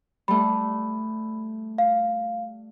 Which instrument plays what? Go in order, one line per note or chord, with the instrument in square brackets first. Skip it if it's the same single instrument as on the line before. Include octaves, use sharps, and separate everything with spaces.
[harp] G3 A3 [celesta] B5
[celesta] F5